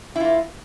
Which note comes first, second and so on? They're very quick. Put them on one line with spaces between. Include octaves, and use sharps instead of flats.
E4 F4 A#3